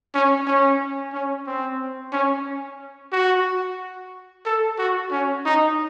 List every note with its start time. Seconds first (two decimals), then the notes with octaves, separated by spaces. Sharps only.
0.14 C#4
0.47 C#4
1.13 C#4
1.47 C4
2.13 C#4
3.12 F#4
4.46 A4
4.78 F#4
5.11 C#4
5.45 D#4